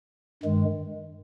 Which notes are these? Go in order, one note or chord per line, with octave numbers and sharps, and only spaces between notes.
G2 D#3 G#3